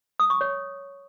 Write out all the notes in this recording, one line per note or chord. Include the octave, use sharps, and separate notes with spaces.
D#6
C#6
C#5